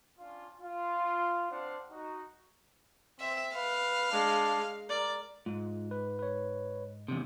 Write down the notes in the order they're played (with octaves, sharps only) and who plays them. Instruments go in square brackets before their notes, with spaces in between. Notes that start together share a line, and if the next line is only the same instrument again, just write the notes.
[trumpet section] C#4 D4 F4
F4
C4 D4 C5 F5 F#5
D#4 F#4
[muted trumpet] C4 [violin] E5
[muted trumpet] B4 [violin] F5
[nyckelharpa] G#3 [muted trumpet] D4
[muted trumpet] A#4 [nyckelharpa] D5
[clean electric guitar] G#2 [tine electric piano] F4
[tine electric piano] B4
B4 C#5
[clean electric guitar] E2 C3